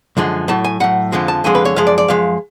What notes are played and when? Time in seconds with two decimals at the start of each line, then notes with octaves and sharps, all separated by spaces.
0.17 F#2 D3 F3 G#3
0.48 A2 F#3 A5
0.64 G#5
0.80 A2 F#3 F#5
1.12 F2 D3 F3 G#3
1.28 A5
1.44 F2 D3 F3 G#3 G#5
1.55 B4
1.65 C#5
1.76 F#2 F3 G#3 F5
1.87 D5
1.98 D5
2.08 F#2 F3 G#3 F5